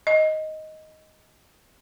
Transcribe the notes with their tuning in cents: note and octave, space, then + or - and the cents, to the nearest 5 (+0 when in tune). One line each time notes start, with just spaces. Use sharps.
D#5 +5